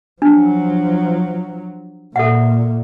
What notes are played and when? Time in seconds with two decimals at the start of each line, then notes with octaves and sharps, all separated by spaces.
0.22 F3 F#3 D4
2.16 A#2 A4 E5 F#5